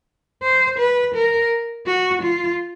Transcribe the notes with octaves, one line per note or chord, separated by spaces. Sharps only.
C5
B4
A#4
F#4
F4